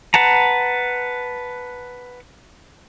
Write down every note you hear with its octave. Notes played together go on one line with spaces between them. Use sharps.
B4 F#5 A5 A#5